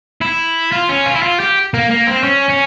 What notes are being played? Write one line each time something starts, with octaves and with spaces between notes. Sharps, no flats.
E4
F4
C#4
F4
E4
F4
G4
A#3
A#3
C4
C#4
C#4